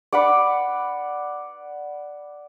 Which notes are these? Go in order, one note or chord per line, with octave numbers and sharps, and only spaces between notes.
D5 F#5 B5